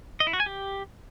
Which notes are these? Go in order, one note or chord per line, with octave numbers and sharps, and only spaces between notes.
D#5
E4
F#4
G#5
G4